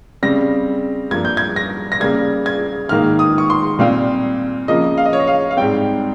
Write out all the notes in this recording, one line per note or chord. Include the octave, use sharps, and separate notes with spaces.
C#3 G3 C4 A#6
G2 F3 A#3 G#6
G6
G#6
A#6
A#6
C#3 G3 A#3 G#6
G#6
G#2 D#3 A#3 F6
D#6
C#6
C6
A#2 G3 C4 F5
C#3 F3 A#3 D#5
F5
D#5
C#5
D#5
F5
F5
G#2 G3 C4 G5